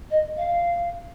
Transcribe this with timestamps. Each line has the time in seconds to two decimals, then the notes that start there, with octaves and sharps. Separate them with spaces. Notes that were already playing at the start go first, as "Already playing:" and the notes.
0.10 D#5
0.36 F5